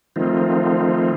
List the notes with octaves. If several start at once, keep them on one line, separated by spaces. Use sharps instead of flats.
D#3 F3 A3 C4 D#4 F4